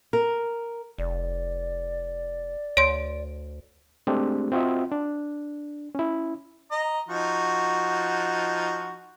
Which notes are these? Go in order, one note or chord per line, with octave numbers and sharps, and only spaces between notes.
A#4
F1 D5
D2 C#5 C6 D7
G#3 A3 C4 D4 G4
C4 F4 F#4 D#5 E5
D4
C#4 E4
D#5 A#5
F3 D#4 F#4